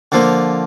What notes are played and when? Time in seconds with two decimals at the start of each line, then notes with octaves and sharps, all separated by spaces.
0.12 D3 F3 A#3